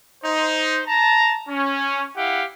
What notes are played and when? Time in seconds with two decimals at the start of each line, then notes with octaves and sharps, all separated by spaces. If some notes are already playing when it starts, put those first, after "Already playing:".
0.23 D#4 C5
0.87 A5 A#5
1.47 C#4
2.16 E4 G4 F5 F#5